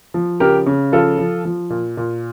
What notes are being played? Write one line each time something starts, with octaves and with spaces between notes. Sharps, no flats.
F3
C#3 G4 A#4
C#3
F3 F4 A4
F3
F3
A#2
A#2